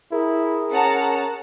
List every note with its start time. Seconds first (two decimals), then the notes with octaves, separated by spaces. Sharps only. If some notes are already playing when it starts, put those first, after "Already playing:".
0.12 E4 G#4 A#4
0.72 C#4 F#5 A5 A#5